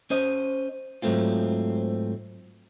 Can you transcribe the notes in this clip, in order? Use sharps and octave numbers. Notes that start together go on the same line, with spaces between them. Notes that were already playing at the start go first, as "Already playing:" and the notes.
C#4 C5 D#5
G#2 F#3 G#3 A3 C4 F4